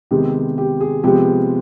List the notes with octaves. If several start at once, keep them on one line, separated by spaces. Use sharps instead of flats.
C3 D#3 G#3 B3 G4
G4
G#4
C3 F3 G#3 B3 G4